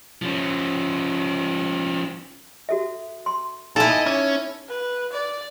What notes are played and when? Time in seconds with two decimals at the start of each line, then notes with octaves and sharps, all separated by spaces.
0.22 F3 C#4
2.69 F#4 A4 E5
3.26 C6
3.76 A#2 D#4 E4 A4 A5
3.89 D#5
4.06 C#4 D6
4.69 B4
5.12 D5